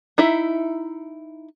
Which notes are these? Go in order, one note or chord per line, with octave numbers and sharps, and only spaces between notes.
D#4 E4 E5